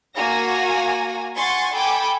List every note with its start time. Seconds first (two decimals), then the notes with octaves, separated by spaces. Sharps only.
0.16 A#3 F#4 G#5 A#6
1.35 F#5 G#5 C6 C#6 A6
1.73 A4 G5 G#5 B5 D6